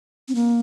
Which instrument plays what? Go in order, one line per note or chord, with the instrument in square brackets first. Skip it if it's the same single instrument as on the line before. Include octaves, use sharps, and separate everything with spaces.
[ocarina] C4
A#3